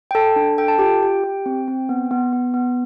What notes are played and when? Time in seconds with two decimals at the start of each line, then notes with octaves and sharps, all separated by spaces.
0.11 G5
0.15 A4 A5
0.36 D4
0.58 A4 G5
0.68 A5
0.79 F4 G4 G5
1.03 G4
1.24 G4
1.46 C4
1.68 C4
1.89 B3
2.11 B3
2.33 B3
2.54 B3